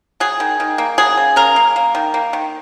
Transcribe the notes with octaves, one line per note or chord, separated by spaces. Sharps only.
F#3 G#4
D#3
D#3
A#3
F#3 G#4
C#3
C#3 A#4
A#3
A#3
D#3
A#3
D#3